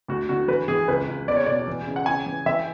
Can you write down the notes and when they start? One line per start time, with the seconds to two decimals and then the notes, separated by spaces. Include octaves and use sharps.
0.08 D2 F#4
0.29 D3 F#4
0.48 E3 B4
0.68 E3 G#4
0.88 C#2 B4
1.08 C#2
1.28 E2 D5
1.36 C#5
1.46 B2 D5
1.68 E3
1.87 C#3
1.96 F#5
2.06 C#3 G#5
2.26 E3
2.46 E3 E5